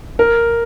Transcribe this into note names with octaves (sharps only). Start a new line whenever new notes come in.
A#4